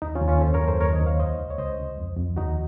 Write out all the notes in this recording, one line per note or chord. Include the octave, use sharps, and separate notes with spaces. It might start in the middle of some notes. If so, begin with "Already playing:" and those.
D#2 D#4
C#4 F4
D#2
C#4 F4
F#2 A4 C5
A#4 C#5
F#2
A4 C5
D#2 A#4 C#5
C5 D#5
D#2
C#5 F5
C#2 C5 D#5
C#2
C#5
C#2 C5 D#5
C#2
F2
F2
D#2 D#4 F#4